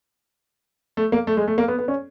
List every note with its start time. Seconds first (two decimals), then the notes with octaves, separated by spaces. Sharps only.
0.97 A3
1.12 A#3
1.27 A3
1.37 G#3
1.47 A3
1.58 A#3
1.68 B3
1.79 B3
1.88 C#4